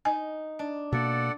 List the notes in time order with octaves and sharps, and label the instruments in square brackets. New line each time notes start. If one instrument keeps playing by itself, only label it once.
[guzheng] D#4 [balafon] G#5
[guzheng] D4
[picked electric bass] B2 A#3 [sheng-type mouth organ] A4 D5 F#5 [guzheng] E5